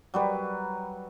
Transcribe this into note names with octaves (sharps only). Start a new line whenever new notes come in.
F#3 G3 B4